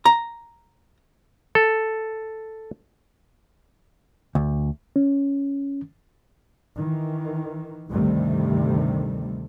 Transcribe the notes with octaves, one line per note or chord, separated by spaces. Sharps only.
A#5
A4
D2
C#4
D#3 E3
D2 G2 C3 D#3 G3 A3